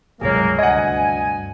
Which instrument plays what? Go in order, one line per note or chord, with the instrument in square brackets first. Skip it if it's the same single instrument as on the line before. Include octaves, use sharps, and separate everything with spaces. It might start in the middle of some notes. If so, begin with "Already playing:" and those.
[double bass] C#2 [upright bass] G2 C3 [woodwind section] F#3 G#3 A#3 [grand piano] G#4 C#5
[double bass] D2 [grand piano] D#5 F#5 [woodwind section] G#5